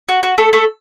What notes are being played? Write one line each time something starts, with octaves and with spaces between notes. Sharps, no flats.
F#4
F#4
A3 A4
A3 A4